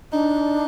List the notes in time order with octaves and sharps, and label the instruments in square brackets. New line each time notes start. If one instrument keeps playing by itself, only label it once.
[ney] D4 [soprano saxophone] D#4